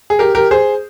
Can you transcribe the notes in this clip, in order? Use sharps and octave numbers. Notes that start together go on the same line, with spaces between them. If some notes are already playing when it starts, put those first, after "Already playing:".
G#4
G4 A#4
G4 A#4
G#4 C5